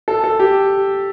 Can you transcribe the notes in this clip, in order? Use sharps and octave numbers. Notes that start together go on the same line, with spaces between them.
A4
A4
G4